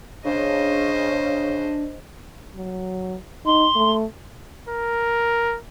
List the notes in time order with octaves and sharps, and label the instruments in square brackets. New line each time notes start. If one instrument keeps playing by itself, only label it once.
[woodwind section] C#3 [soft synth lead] D4 [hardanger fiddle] C5 D#5
[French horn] F#3
[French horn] D#4 [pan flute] C6
[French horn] A3
[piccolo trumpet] A#4